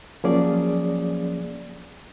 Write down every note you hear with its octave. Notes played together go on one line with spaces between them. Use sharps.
F3 F#3 A#3 C#4 G#4 D5